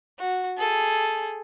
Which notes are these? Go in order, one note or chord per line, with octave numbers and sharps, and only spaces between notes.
F#4
G#4 A4